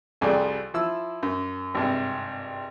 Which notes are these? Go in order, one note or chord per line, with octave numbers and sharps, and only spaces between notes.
C2 F2 G3 F4 G#4 D5
F3 E4 E6
F#2
G#1 G2 C3